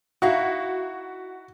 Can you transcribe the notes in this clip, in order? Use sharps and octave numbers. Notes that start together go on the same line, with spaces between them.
D#4 E4 F#4 F5